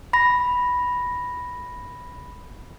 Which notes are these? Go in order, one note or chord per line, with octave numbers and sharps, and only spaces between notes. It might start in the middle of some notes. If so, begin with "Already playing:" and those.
B5 A#6